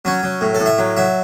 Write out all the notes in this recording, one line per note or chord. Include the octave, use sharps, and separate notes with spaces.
F#3 C#4
F#3
A2
A4
A2
E5
F#3
F#3 E5